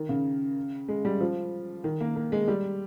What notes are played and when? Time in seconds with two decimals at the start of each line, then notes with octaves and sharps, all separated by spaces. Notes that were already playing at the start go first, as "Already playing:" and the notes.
Already playing: D#3
0.09 C#3
0.89 G#3
1.05 G3
1.21 F3
1.84 D#3
2.00 A#3
2.16 A#3
2.32 G#3
2.48 G3